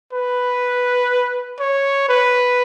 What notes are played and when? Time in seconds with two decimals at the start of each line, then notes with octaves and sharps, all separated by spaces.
0.13 B4
1.60 C#5
2.09 B4